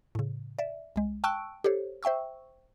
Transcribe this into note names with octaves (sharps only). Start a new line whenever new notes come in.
A2 C#3
D5 E5
C2 G#3
G5 A5 C#6 E6 F#6 D7
G4 A4 C5 C#5
C5 E5 G5 C#6 E6